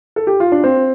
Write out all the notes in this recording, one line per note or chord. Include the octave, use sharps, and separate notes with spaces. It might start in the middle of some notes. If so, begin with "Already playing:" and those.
A4
G4
F4
D4
C4